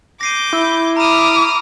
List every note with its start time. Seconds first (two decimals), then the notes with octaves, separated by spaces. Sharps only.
0.21 D6 G6 A#6 C7 D#7
0.53 E4
0.97 A#5 B5 D6 D#6 F6 E7